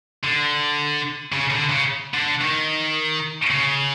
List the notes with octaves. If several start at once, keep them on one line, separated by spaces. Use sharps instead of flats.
D3
C#3
D3
C#3
D3
D#3
C#3